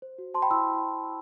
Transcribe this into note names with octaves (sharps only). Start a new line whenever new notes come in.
C5
F#4
C5 A5 C6
G5 B5
E4 C6 E6